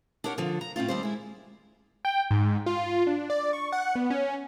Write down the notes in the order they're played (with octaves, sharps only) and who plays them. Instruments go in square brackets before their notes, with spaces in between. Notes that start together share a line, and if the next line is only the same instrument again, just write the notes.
[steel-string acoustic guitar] D4 G4 A#4 C#5 F#5
D3 F3 F4
A#5
A2 C4 C#4 F4
D#2 G3 C5
G#3 E4
[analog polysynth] G5
G#2
F4
D4
D5
C#6
F#5
B3
C#4